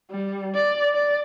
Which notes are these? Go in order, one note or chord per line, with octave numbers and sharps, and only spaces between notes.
G3
D5
D5